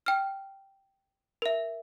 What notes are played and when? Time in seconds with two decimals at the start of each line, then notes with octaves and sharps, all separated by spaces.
0.06 G5 F6
1.42 A#4 E5